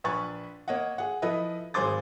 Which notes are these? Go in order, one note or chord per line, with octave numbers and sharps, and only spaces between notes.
A#1 B4 G#5 B5 C#6 A6
A#3 C#5 D#5 F#5
G#4 F#5
F3 E4 A4 B4 D#5
G#1 G#4 C5 C6 D6 A6